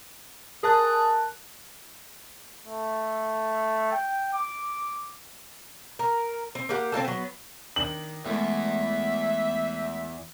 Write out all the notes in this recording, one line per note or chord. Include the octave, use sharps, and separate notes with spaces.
G#4 A#4 A5 F#6
A3
G5
D6
A#4
C4
A#3 G4 F#5
C4 D#4 F4 A4
F#3 B3
D#3 D4 F#7
E2 G#3 A3 E4 E5